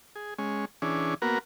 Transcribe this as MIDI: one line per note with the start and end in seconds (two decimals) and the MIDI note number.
0.16 0.34 68
0.38 0.65 56
0.38 0.65 61
0.82 1.14 52
0.82 1.14 61
0.82 1.14 62
0.82 1.14 68
1.22 1.39 58
1.22 1.39 59
1.22 1.39 66
1.22 1.39 70